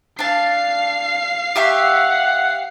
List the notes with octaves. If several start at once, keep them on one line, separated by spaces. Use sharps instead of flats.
D4 F5 A5 C7
G4 E5 F#5 C#6